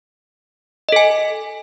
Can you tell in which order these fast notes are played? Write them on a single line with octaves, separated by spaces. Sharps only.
D#5 A4 G#5